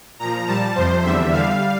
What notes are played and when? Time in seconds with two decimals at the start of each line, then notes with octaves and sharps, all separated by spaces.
0.19 A#2 F3 A#5
0.47 A#2 G3 A5
0.75 F2 C3 F3 C5
1.03 E2 D3 G3 E5
1.31 E2 D3 G3 F5